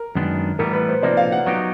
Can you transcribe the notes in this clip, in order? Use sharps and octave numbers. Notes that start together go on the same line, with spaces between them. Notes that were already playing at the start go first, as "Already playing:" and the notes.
Already playing: A#4
F#2 D#3 G#3 B3 D4
A2 E3 G3 B3 A#4
B4
C5
C3 F3 A#3 D#4 D5
F5
F#5
F#3 B3 D#4 G4